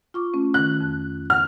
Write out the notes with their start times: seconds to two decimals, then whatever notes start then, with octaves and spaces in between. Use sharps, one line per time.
0.14 F4 C#6 D6
0.34 A3 C#4
0.54 D#3 F#6
0.80 F2
1.30 F#5 F6